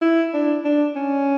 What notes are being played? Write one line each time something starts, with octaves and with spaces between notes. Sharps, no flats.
E4
D4
D4
C#4